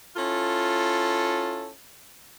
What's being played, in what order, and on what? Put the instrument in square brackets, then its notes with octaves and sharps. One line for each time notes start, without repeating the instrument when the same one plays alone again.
[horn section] C#4 E4 F4 A4